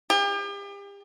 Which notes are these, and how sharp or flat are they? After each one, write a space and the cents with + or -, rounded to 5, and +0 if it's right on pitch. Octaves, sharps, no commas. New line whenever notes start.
G4 +40